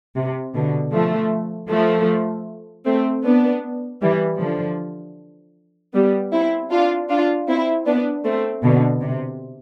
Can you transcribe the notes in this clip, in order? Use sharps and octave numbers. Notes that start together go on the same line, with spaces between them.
C3
B2 D3
F3 A3
F3 A3
A3 C4
B3 D4
E3 G3
D3 F3
G3 B3
C4 E4
D4 F4
D4 F4
C4 E4
B3 D4
A3 C4
B2 D3
C3